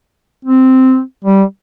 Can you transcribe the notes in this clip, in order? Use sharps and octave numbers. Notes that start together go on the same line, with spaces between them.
C4
G3